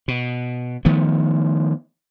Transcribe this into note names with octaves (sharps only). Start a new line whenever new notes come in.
B2
D#3 F3 A3 B3